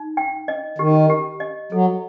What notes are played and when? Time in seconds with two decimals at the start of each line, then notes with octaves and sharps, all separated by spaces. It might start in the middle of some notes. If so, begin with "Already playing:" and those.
Already playing: D#4
0.17 G5
0.48 D#5
0.78 D#3 G4
1.10 G4
1.40 D#5
1.72 F#3 A4